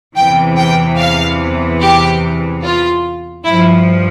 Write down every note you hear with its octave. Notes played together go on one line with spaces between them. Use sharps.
E2 C3 E3 G5
G5
F5
G4
F4
G2 F3 E4